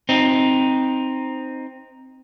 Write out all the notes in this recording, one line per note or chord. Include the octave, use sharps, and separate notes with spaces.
C4 D#4